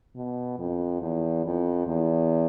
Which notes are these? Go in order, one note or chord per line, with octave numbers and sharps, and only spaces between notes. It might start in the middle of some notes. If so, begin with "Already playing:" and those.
B2
F2
E2
F2
E2